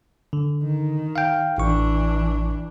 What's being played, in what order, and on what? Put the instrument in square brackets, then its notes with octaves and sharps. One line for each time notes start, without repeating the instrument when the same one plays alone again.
[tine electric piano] D3
[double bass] D#3
[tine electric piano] F5 G5
[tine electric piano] A1 C#6 [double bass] E3 D4